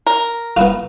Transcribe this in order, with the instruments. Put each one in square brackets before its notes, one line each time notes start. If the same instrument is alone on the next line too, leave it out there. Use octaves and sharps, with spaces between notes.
[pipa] A#4
[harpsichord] B3 E4 F4